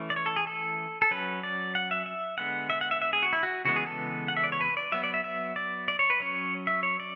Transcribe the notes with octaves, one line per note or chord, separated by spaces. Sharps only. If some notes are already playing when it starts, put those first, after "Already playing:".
Already playing: E3 A3 C#4
D5
C#5
A4
G#4
A4
A4
F#3 C#4 B4
D5
F#5
E5
E5
D3 G#3 B3 F#5
E5
F#5
E5
E5
G#4
F#4
E4
F#4
C#3 E3 G#3 B3 F#4
G#4
A4
F#5
E5
D5
C#5
B4
D5
F#3 B3 E5
D5
E5
E5
D5
D5
C#5
B4
F#3 C#4 C#5
E5
C#5
D5